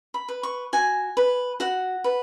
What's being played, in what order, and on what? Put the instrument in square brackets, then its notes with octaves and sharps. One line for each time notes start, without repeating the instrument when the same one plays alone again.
[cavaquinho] B5
B4
C#6
F#4 G#5
B4
F#4 F#5
B4